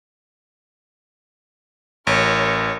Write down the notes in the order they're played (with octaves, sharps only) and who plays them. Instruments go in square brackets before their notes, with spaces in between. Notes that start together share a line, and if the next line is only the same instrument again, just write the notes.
[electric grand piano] A1 [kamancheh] A#4 C#5